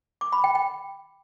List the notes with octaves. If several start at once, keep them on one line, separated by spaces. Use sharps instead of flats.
D6
B5
G5
G5